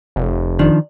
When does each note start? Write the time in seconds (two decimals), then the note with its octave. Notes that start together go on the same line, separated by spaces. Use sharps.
0.16 F1
0.59 D#3 F3 D4